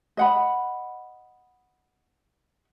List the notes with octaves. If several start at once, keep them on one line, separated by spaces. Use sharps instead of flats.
D#5 F#5 B5